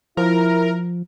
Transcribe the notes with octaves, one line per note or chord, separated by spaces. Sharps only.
F3 E4 A#4